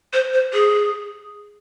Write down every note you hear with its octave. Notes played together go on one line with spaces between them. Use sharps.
C5
C5
G#4